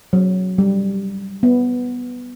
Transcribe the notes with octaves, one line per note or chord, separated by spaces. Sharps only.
F#3
G3
B3